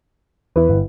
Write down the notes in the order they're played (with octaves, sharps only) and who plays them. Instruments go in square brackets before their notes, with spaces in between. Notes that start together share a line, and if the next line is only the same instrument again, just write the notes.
[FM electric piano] E2 [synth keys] E4 B4
[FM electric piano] G1